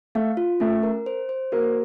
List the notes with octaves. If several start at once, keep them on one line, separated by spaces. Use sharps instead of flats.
A3 F5
F4
A3 C#4
A#4
C5
C5
A#3 F#4